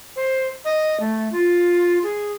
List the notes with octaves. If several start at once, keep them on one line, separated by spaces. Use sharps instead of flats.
C5
D#5
A3
F4
G#4